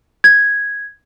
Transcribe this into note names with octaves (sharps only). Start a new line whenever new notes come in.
G#6